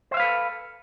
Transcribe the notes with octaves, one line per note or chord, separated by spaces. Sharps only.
A4 B4 C5 E5 F5